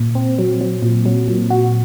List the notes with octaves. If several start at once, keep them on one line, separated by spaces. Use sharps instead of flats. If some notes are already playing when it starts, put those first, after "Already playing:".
Already playing: A#2
C4
F#3
F#3
A#2
F#3
A#2
F#4